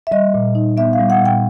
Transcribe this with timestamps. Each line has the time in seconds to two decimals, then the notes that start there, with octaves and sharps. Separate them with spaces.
0.07 E5
0.12 G3 D#5
0.34 A#2
0.55 D#4
0.77 B3 E5
0.93 F5
0.99 G3
1.10 F#5
1.21 A#2
1.26 G5